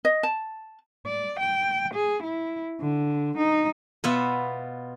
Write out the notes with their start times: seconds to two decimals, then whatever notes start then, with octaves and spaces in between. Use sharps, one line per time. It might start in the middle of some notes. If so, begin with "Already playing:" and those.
0.05 D#5
0.23 A5
1.06 D5
1.40 G5
1.94 G#4
2.23 E4
2.81 D3
3.38 D#4
4.04 B2 B3 F4 E5